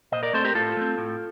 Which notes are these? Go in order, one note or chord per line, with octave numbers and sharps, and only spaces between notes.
A#2 C5 D#5
A#4 D5
A3 C4 A4 C5
G4 A#4
A2 F4 A4
A3 C4
A2